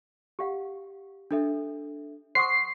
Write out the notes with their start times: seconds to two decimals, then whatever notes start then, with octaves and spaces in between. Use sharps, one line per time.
0.39 G4 F5 F#5
1.31 D4 A4 E5
2.35 C5 F#5 C6 C#6 D#6 C7